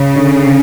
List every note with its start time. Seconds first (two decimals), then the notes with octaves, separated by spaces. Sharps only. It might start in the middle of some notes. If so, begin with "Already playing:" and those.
Already playing: C#3 C#4
0.16 D3